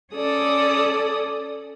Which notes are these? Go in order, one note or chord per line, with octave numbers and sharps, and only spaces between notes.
C#4 A4 D5 D#6